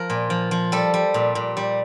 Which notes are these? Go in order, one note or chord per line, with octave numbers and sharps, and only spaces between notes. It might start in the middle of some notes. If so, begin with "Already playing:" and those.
Already playing: F3 A#4
A#2
F3
F3
G3 A4
G3
A#2
A#2
G3